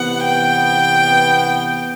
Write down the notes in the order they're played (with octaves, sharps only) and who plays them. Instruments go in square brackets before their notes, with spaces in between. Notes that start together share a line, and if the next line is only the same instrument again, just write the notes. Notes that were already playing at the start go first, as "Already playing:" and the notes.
Already playing: [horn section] C3 E3 B3 [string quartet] F#5
[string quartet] G5